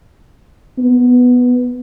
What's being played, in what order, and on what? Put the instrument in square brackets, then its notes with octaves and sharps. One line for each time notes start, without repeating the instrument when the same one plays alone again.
[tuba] B3